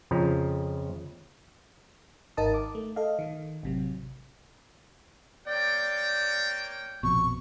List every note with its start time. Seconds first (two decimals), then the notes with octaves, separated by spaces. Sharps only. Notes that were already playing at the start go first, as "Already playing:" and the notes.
0.11 F2 C#3 F3 A#5
2.37 G#1 D#4 A#4 A5 D#6
2.54 D6
2.75 A3
2.96 A4 D#5 F5
3.19 D#3
3.63 A1 C3 F#3
5.47 A#3 C#5 D5 G5
7.03 A#1 F2 B2 C#6